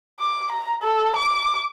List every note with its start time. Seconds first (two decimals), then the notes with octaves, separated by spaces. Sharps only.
0.20 D6
0.52 A#5
0.82 A4
1.16 D6